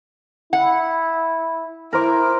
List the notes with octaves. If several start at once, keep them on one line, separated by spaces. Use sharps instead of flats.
E4 F#5
E4 A#4 C5 D6